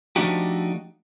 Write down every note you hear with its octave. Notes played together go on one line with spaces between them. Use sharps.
F3 A3 D4 D#4 F#4 G4